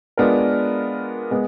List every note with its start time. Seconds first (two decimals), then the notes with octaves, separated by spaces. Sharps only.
0.18 G#3 B3 D4 F4 A#4
1.31 G#3 B3